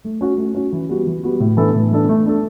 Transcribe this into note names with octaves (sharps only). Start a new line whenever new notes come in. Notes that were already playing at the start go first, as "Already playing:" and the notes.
A3
C#4 F#4
A3
C#4 F#4
E3
G3 B3 F#4
E3
G3 B3 F#4
A2
E3 B3 D4 A4
A2
E3 B3 D4 A4
A3
D4 A4